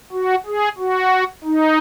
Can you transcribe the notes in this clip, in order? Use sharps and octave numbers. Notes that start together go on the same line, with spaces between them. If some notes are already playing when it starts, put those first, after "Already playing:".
F#4
G#4
F#4
D#4